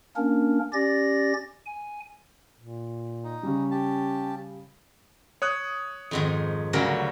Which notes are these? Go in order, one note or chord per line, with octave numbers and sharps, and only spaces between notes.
A#3 C#4 D4 A#4
C#4 G4 D5 A6 A#6
G#5
A#2
D#4
C#3 G3 C#4
G4 A5
C#5 D#6 F#6
F2 G#2 D#3
D2 C#3 F#3 G3 F#4 A#4